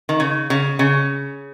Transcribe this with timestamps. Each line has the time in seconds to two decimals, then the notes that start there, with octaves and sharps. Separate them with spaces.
0.09 D#3
0.20 C#3
0.50 C#3
0.79 C#3